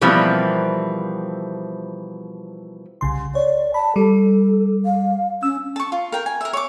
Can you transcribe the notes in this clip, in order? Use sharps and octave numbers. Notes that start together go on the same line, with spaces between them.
B2 E3 F3 G3 A#3 C4
C2 C#3 C6
C#5 D5
A5 B5
G3 A4
F5
C#4 E6
A5 C#6
F4
A#4 G5
G#5
A#4 E5
C#5 D6